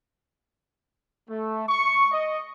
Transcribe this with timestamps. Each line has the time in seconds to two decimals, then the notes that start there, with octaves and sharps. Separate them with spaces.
1.29 A3
1.68 C#6
2.11 D#5